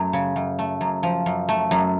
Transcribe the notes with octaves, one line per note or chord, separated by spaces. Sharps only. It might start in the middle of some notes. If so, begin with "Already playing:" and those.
Already playing: F#2 A3
C#3
F#2
A3
F#2
F3
F#2
A3
F#2